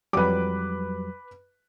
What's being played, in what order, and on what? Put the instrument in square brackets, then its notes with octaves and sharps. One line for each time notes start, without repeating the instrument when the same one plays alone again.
[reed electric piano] F2 F#3 G3 [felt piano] B4 D6